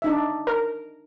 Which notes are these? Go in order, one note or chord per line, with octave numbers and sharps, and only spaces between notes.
D4 D#4 E5
A#4